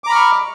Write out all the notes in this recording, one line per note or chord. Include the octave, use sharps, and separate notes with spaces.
A#5 B5 C#6 D6 F6